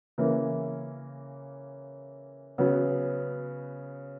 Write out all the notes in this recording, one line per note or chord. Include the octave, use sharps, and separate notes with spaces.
C#3 E3 A#3
C#3 F#3 B3